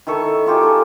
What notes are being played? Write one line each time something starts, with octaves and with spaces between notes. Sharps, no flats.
D#3 E4 A4 C#6
D#4 F4 G4 G#4
A4